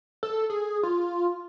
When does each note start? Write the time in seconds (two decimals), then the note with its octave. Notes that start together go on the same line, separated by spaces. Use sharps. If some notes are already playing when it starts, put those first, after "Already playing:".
0.23 A4
0.50 G#4
0.83 F4